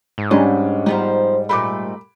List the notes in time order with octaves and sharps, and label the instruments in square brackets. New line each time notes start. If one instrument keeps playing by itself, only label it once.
[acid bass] G#2
[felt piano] G3 C#4 D4 [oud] D#5
[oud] F3 B3 D#4 [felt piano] G3
[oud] A#2 G3 A3 [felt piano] B5 D6